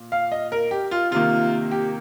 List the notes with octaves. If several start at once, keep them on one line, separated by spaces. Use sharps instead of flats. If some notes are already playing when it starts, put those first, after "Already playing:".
Already playing: A#2
F5
D#5
A#4
G4
F4
C3 D#3 A#3 F4
G4